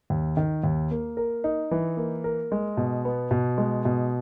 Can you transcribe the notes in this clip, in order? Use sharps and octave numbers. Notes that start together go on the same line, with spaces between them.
D#2
D#3
D#2
A#3
A#4
D#4
E3
A#3
A#4
G#3
B2
B3
B2
G#3
B2